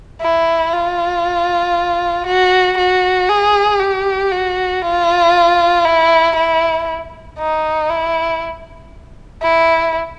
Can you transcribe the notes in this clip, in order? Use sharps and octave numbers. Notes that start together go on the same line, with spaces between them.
E4
F4
F#4
F#4
G#4
G4
F#4
F4
E4
E4
D#4
E4
E4